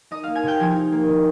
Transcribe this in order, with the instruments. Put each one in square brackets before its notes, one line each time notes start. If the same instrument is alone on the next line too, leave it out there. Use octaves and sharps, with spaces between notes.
[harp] D#4 D#5 D#6
A#3 F5 F6
G#5 G#6
C3 G5 G6
F3 G#5 G#6
D#4
A#3
C3